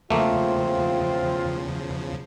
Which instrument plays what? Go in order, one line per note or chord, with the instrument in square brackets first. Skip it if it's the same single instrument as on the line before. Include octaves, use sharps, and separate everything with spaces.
[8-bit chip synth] E2 C#3 F3 [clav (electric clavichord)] A3 A#3 [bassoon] C4 [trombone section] F4